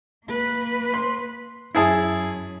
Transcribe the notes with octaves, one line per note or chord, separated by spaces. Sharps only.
A#3 B4
C6
F#2 E4 G#4 A5